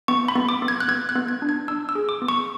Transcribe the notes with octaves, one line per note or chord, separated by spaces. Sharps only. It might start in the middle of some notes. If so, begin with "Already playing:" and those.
B3 C#6
B5
B3
D6
B3
G#6
F#6
B3 G#6
F#6
B3
G#6
D4
G#6
D4 E6
E6
G#4
D6
B3
C#6